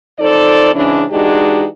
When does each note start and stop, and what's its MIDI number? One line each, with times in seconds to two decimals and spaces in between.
0.19 0.72 41
0.19 0.72 63
0.19 0.72 69
0.19 0.72 72
0.19 0.72 74
0.74 1.04 44
0.74 1.04 49
0.74 1.04 52
0.74 1.04 61
0.74 1.04 62
1.10 1.66 52
1.10 1.66 56
1.10 1.66 62
1.10 1.66 63
1.10 1.66 66
1.10 1.66 67